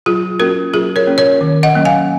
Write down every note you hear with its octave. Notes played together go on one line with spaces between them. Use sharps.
F#3 F4 G#4
A#3 C#4 F#4 A#4
F#3 F4 G#4
A#4 C#5
A#3 C#4
A#4 C#5
D#3
D#5 F#5
F#3 A#3 C#4
F5 G#5